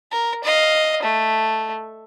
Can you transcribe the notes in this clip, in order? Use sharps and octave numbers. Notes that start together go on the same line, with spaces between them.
A#4
D#5 F5
A3